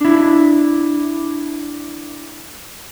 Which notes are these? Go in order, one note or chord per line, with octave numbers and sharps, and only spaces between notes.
D4 E4